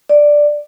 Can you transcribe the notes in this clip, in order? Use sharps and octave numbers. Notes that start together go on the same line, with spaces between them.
D5